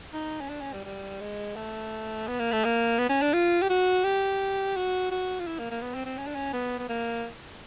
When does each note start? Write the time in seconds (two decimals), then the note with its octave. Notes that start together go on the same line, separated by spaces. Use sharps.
0.13 D#4
0.40 C#4
0.49 D4
0.61 C#4
0.73 G3
0.85 G3
1.20 G#3
1.56 A3
2.27 B3
2.39 A#3
2.52 A3
2.65 A#3
2.98 B3
3.09 C#4
3.22 D4
3.33 F4
3.62 G4
3.70 F#4
4.04 G4
4.76 F#4
5.11 F#4
5.40 F4
5.47 E4
5.59 A#3
5.71 A#3
5.82 B3
5.94 C4
6.05 C4
6.18 C#4
6.27 D4
6.35 C#4
6.53 B3
6.78 B3
6.89 A#3